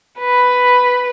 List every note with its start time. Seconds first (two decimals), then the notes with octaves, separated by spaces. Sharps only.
0.20 B4